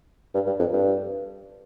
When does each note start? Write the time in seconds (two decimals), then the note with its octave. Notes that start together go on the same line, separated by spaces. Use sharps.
0.34 G2
0.47 G2
0.59 F2
0.73 G2